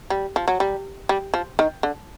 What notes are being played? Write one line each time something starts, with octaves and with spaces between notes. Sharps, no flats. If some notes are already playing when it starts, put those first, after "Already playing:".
G3
F3
F#3
G3
G3
F3
D#3
D3